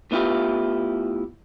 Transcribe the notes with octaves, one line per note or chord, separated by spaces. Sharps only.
A2 B3 E4 F4 G4